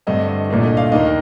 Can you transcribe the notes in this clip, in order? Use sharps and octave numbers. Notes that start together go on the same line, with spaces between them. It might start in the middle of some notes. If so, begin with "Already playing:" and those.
G2 D3 A3 C4 D#5
D#5
C2 A#2 A3 D4
D#5
F5
D#2 D#3 A#3 D#5